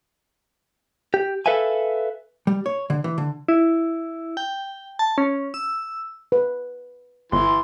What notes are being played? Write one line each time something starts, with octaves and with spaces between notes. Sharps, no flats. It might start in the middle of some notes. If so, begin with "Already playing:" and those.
G4
A4 B4 E5 F5 G#5
G3
C#5
D3
E3
D3
E4
G5
A5
C#4
E6
B4
G1 E3 C6